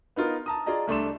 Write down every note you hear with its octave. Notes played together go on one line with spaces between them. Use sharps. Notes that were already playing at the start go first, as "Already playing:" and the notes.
B3 D#4 F4 A#4
A5 A#5 D#6
F4 G#4 D5 D#5 A#5
C2 A3 D4 C6 E7